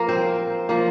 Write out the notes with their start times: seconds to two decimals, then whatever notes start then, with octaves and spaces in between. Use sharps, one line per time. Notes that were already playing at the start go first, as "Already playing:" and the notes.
Already playing: F3 A#3 A#4
0.09 C4 C5
0.69 F3 A#3